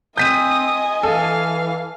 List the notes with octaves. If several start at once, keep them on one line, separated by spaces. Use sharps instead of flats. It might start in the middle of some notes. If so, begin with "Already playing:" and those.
C4 D#5 G#5 D#6 G6 B6 D#7
E3 A4 F5